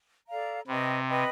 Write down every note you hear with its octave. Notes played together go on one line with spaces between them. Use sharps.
A4 D5 F5 A#5
C3 B4 D#5 G5 B5
B4 D#5 G5 B5